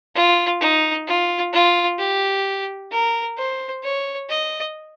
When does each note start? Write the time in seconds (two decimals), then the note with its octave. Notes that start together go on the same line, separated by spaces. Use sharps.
0.15 F4
0.60 D#4
1.07 F4
1.53 F4
1.99 G4
2.91 A#4
3.38 C5
3.83 C#5
4.29 D#5